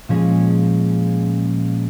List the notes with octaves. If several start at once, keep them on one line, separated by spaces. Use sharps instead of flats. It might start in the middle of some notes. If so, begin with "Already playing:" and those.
A#2 F3 G#3 C#4 G#4